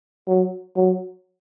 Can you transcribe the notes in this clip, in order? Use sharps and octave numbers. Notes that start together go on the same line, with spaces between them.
F#3
F#3